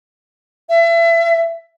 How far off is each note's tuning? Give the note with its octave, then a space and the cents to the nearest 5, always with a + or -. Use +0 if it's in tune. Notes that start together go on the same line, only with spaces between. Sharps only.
E5 +35